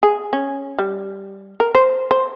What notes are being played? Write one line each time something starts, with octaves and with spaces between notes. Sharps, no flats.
G#4
C#4
G3
A#4
C5
C5